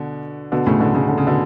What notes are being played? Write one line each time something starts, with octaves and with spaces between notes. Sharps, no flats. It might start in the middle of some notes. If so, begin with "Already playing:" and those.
Already playing: B2 D3
B2 D3
A2 C#3
B2 D3
A2 C#3
D3
C#3
B2 D3